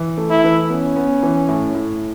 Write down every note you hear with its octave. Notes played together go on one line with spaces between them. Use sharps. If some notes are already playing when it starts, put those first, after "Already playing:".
Already playing: E3
A3
E4
E3
B3 C#4
B3
E3
A2
A2